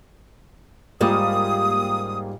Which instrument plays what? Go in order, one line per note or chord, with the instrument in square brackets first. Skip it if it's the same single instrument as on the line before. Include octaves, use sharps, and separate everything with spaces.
[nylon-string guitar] G#2 G3 [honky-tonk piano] A#3 F4 G4 [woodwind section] D#6